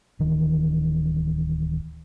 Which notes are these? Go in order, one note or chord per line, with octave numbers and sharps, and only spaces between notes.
D1 D#3 E3